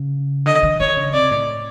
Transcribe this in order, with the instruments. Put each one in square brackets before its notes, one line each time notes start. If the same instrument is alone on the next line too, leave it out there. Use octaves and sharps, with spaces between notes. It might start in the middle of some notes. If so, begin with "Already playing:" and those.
Already playing: [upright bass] C#3
[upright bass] D3 [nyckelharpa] D#5
[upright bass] D#3
[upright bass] D3 [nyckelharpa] C#5
[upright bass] C#3
[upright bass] C3 [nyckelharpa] D5
[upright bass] A2